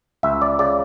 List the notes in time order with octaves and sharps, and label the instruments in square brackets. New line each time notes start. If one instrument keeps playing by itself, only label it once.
[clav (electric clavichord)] C#2 E5
D5
C#3 D5